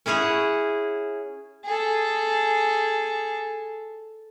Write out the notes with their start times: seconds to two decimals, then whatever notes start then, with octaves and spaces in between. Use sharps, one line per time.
0.06 C#4 E4 G#4 C#5 F#5
1.64 G#4 A4